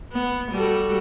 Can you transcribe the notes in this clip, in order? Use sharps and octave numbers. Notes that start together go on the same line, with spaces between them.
B3
G3 F#4 A4